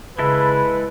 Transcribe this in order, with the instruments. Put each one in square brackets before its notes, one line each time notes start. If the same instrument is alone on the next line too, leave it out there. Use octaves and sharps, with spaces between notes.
[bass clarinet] C#3 [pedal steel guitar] G#3 E4 A4 [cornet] B4